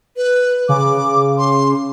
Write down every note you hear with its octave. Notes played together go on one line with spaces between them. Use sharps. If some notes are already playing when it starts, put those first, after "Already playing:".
B4
C#3 D6
C6